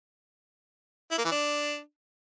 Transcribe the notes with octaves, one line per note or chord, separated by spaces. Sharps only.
E4
A#3
E3
D4